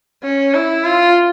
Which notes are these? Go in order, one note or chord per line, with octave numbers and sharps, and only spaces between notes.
C#4
E4
F4